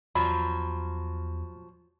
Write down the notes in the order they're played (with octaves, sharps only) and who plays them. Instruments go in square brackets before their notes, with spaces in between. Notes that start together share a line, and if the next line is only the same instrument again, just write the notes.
[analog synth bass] E2 [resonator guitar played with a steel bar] F3 F#3 [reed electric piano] B5